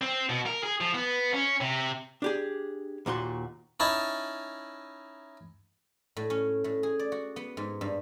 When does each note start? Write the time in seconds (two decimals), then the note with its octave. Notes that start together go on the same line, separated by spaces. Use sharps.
0.01 C4
0.29 B2
0.46 A#4
0.63 G#4
0.81 F3
0.94 B3
1.34 C#4
1.61 C3
2.22 D4 G4 G#4
3.06 D#2 A#2 F#4 C6
3.80 C#4 D#4 E4 A5
6.17 A2
6.30 C#4
6.64 A2
6.83 G#4
6.99 D5
7.12 F#4
7.36 B3
7.57 G#2
7.81 G2